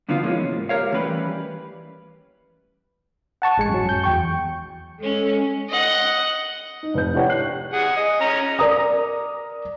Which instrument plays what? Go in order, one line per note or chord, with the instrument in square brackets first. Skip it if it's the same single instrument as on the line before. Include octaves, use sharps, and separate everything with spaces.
[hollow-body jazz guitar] G2 D3 E3 F3 B3 F4
C3 E3 F3 G#3 A#3 C#4
G#2
G4 A#4 C#5 F5
E3 G3 A3 C#4 G4 B4
[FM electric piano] F#5 A5 C#6
A1 G#3 G#5 C#7
F#2 F#3
G6
E2 G5 C#6
[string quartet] G#3 C#4 [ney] A4
[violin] D#5 F#5
[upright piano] D#4
F1 B4 G6
D4 E4 G4 B4 C#5 F#5
F#6 C7 F#7
[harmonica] G#4 F#5
D#5
C#4 A#5
[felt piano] A#4 D5 A#5 D#6